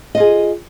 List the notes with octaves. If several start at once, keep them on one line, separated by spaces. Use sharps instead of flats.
F4 G#4 D#5